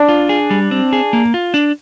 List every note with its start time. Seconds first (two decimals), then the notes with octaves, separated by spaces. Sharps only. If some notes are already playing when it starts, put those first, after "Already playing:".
Already playing: D4
0.09 F4
0.29 G#4
0.50 G3
0.71 C4
0.93 G#4
1.13 A#3
1.34 F4
1.54 D4